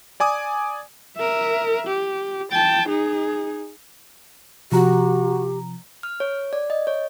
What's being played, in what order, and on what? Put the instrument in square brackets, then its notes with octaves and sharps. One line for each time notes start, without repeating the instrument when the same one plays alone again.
[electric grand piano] D5 G#5 D6 D#6
[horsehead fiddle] A#4 E5
G4
G5 A5
D#4 G#4
[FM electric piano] C3 F3 A#5 [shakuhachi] F#4 [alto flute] G4
[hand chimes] F6
C#5
D5
D#5
C#5